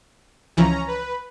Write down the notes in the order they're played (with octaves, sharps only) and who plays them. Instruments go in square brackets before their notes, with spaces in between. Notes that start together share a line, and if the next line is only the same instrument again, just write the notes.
[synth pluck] C#2 E3 F3 [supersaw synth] C#4 A#5
[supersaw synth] B4